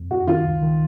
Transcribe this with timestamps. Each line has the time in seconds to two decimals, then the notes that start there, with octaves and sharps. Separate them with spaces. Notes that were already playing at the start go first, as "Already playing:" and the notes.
Already playing: F2
0.11 F#2 F#4
0.27 D#3 F4
0.45 C#2
0.62 D#3